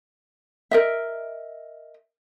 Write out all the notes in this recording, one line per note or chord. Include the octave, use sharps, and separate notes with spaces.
A#4 D#5 E5